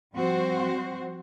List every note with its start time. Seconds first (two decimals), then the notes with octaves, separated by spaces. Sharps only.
0.15 F3 G3 C4 F#4 C5